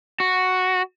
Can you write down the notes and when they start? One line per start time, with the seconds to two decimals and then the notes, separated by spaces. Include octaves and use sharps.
0.20 F#4